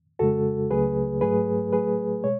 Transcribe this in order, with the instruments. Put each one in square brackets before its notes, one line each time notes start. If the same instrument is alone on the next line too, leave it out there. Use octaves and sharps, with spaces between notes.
[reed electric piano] F2 C#3 G#3 F#4 A4
C#2 C#3 F#3 A3 G#4 B4
G#2 F#3 A3 G#4 B4
A2 F#3 A3 G#4 B4
B2 G#3 C#5